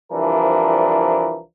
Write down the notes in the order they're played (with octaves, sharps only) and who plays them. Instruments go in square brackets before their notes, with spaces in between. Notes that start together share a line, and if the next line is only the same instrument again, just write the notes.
[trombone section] C2 E3 F3 D4 A#4